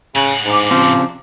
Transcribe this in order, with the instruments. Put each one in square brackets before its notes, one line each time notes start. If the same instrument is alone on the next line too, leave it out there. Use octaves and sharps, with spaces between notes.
[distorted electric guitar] A2 F#5 [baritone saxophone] C#3
[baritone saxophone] G#2 [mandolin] D4 A#5 D6
[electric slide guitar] C#3 C4 [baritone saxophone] F3